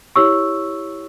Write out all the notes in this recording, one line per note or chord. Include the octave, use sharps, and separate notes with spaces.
E4 G4 C#5 C#6 E6